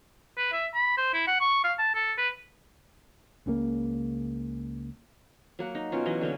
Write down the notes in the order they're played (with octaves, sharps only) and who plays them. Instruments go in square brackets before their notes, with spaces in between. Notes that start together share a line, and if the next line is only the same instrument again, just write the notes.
[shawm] B4
E5
B5
C5
E4
F#5
C#6
F5
A5
A4
B4
[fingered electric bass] C#2 C#3 E3 A#3
[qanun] F#3 A#3 F#5
D#4
B2 C#4 F4
E3 F#3 D#5
D3 A#3 C#4